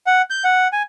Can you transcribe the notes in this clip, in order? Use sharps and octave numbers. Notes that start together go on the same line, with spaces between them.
F#5
G6
F#5
G#5